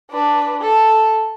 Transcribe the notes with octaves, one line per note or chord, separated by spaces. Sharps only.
D4 B4
A4